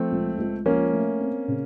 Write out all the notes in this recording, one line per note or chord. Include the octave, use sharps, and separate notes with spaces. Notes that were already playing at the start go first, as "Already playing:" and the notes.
Already playing: F3 A3 C4
C#2
C#2
F3 A#3 C#4
A3
C4
C#3